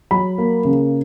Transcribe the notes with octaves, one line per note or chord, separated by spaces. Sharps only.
F#3 B5
A#3
C#3